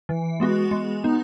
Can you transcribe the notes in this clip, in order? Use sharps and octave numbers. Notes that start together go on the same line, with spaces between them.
E3
G#3 B3 F#4
G#3
B3 D#4